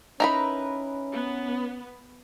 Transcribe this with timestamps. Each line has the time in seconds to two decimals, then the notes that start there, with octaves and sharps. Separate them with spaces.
0.20 C#4 D#4 E4 A#4 B4 A#5 B5
1.14 B3